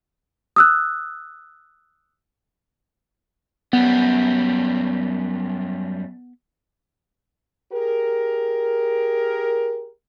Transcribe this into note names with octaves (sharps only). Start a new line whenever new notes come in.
D#6 E6 F#6
F#2 G3 B3
G4 G#4 A#4